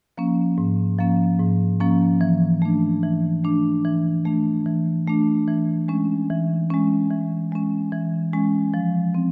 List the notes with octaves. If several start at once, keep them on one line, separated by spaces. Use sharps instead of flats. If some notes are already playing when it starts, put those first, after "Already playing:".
F3 A#3 C#4
G#2
F3 A#3 C#4
G#2
F3 A#3 C#4
E3
A3 D4
E3
A3 D4
E3
A3 D4
E3
A3 D4
E3
G#3 C#4
E3
G#3 C#4
E3
G#3 C#4
E3
G#3 C#4
F3
C4